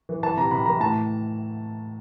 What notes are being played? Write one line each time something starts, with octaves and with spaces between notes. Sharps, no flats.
E3
E3 A5
C3 A#5
C3 B5
E3 A#5
A2 A5